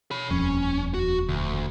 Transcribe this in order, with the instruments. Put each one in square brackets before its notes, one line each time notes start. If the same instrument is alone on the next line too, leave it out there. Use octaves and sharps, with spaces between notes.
[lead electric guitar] C#5 B5
[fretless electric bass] D#1 F2 [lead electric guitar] C#4
[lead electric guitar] F#4
D2